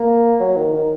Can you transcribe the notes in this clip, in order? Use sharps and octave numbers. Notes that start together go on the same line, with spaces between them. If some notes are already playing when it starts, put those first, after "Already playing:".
Already playing: A#3
F#3
D#3
D#3